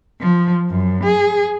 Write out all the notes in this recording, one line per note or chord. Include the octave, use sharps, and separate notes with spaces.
F3
F#2
G#4